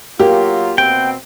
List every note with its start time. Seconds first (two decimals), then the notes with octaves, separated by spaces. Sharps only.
0.19 F#3 A#3 F4 G4
0.78 B2 C4 G5